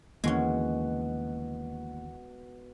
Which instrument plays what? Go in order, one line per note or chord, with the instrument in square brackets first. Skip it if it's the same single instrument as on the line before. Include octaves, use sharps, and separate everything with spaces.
[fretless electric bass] D#2 D3 E3 [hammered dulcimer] B2 F#4 [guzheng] G#3 C#4 [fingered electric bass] A#3